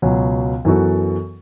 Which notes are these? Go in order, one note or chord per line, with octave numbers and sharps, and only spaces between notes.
C#2 B2 F#3
F#2 E3 B3 F#4 A4